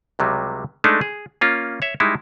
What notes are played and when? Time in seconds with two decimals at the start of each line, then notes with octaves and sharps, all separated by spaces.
0.19 C#2 C3 F#3 G3
0.84 G#3 A3 D4 D#4
1.01 G#4
1.41 A#3 C#4 F4
1.82 C#5 E5
2.00 G3 G#3 D#4 E4